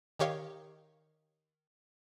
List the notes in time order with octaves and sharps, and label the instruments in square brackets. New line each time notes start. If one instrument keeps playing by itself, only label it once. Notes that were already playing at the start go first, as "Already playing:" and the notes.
[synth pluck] D#3 G4 C#5 F5